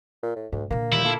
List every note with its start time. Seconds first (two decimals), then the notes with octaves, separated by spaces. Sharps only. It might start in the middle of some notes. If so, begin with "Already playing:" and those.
0.23 A#2
0.36 A2
0.52 D2 G#2
0.71 A#2 D3 A#3
0.92 D#2 F3 G3 E4
1.05 A#3 F4 A4